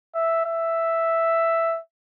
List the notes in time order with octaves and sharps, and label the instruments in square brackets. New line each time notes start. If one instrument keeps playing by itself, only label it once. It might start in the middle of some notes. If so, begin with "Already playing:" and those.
[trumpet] E5
E5